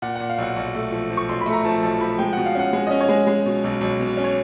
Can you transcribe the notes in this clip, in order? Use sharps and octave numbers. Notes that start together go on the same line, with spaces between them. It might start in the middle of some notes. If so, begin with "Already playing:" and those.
A#2 F#5
A#2 F#5
F5
B1 F#5
B1
A3
F3
F3
C#6
B1 C6
B5
A3
A#5
F3 A5
B1 A5
F3 B5
G#3 G5
B2 F#5
F5
C#4 F#5
G#3
C#4 D#5
C#5
G#3
G#3
B2
B1
B1
B2
C#4
C#5